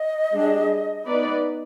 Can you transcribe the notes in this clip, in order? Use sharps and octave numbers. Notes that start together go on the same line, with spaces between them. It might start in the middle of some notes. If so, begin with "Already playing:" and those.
Already playing: D#5
G3 D4 G#4
B3 D#4 B4 D5
D#5